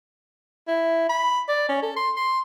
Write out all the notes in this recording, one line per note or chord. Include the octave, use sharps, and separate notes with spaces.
E4
B5
D5
C#4
A4
C6
C6